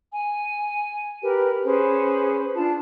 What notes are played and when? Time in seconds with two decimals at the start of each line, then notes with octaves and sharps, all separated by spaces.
0.13 G#5
1.22 G4 A#4 B4
1.65 C#4 G#4 B4 C5
2.55 D4 F4 A5